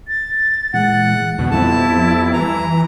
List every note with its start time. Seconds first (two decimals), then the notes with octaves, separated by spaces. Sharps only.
0.08 A6
0.74 A#2 E3 G#3 F#5
1.39 F2 B2 D3 D#3
1.51 F2 G3 B3 E4 A5
2.33 E3 A#5